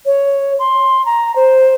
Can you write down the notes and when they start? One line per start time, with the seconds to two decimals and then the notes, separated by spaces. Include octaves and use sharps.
0.06 C#5
0.59 C6
1.06 A#5
1.36 C5